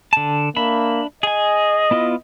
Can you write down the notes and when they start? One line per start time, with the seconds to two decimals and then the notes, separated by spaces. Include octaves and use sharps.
0.13 D3 A5
0.57 A#3 D4 E5 B5
1.23 G#4 D#5 G#5
1.91 B3 E4 F4